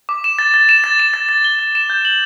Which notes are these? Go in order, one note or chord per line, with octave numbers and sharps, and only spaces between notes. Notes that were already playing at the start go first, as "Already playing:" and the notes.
D6
E7
A6
A6
E7
A6
E7
A6
A6
G7
A6
E7
G6
F#7